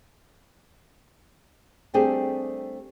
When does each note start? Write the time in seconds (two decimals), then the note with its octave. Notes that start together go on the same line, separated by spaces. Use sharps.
1.94 G3 A3 C4 D4 G4 G#4